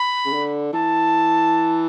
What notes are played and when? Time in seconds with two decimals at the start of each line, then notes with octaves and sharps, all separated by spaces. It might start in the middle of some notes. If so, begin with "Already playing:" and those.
Already playing: B5
0.26 C#3
0.33 D3
0.73 E3 A5